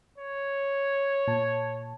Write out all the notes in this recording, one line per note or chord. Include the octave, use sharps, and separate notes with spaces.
C#5
A#2 A5